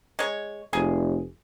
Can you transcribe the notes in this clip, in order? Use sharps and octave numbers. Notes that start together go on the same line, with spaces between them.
G#3 C#5
F1 G#4